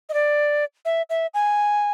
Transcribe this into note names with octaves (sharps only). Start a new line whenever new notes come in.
D#5
D5
E5
E5
G#5